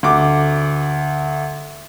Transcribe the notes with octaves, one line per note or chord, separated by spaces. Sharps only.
D2 D6